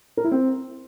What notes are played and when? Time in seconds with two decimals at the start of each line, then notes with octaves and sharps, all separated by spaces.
0.17 A#4
0.24 E4
0.31 C4